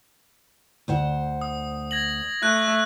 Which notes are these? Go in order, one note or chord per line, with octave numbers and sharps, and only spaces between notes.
D2 C5 F#5
D#6
G#6 A#6 F#7
A3 F#6